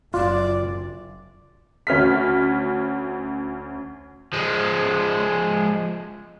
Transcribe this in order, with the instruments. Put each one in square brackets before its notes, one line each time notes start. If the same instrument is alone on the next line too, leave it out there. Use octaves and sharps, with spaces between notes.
[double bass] F#1 [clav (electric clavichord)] F4 [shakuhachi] D5
[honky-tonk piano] D2 C#4 F6 B6
[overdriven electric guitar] F3 G#3